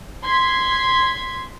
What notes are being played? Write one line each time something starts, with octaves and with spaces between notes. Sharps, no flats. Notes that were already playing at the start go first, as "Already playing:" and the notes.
C6 G#6 B6